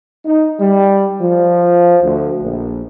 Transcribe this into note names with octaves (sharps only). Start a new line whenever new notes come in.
D#4
G3
F3
D2
A#1